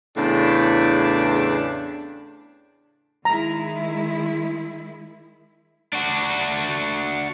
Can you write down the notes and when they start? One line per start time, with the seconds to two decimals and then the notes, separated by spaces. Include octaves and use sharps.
0.17 E2 A2 C#3 D4
3.25 D#3 G#3 E4 A#5
5.93 D4 F#4